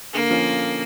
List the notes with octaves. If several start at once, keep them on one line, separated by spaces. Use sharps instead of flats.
D3 A#3
F3 C#4 F4